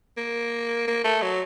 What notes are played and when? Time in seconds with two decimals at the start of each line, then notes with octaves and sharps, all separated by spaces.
0.17 A#3
0.87 A#3
1.04 A3
1.22 F#3